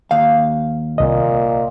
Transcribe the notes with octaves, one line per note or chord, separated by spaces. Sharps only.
D#2 F5
C2 A#2 D#5